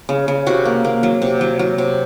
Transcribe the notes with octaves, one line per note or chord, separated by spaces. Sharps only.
C#3
C#3
C3 F#4
A#3
A#3
F#3
C3
F#3
F#3
C3